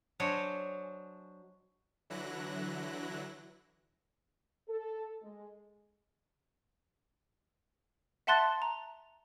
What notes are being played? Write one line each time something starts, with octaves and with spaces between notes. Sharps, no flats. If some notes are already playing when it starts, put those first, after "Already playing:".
F#3 D4 C5 C#5 D#5 G#5
D3 E3 F#3 E4 F#6 A#6
A4
G#3
E5 F#5 A5 C6 F#6 A6
A#5